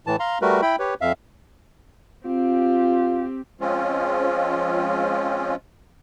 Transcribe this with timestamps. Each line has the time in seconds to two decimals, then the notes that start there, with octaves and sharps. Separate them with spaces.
0.07 A2 E3 A5
0.20 F5 A#5 C6
0.42 G3 A3 F#4 A#4 B4
0.62 E4 G5 B5
0.79 G4 B4 C#5
1.01 F2 E5 F5
2.26 C4 F4 G4
3.61 F3 G#3 C4 C#4 F4